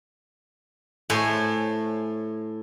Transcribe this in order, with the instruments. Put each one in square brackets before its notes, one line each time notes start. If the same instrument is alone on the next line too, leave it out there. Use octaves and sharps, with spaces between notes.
[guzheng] A2 C5 C#5 G#5